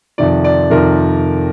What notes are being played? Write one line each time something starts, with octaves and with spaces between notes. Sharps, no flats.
F2 C3 D#3 D5
D5
F2 C3 D#3 A#4